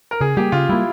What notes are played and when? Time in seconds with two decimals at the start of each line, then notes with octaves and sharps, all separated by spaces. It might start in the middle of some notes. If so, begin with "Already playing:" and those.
0.11 A#4
0.21 C#3 G#4
0.37 G3 A#3 G4
0.52 C#3 F4
0.69 G3 A#3 E4